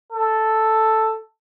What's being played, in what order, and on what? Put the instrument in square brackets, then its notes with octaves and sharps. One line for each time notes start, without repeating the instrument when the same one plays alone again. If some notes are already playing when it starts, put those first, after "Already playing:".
[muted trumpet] A4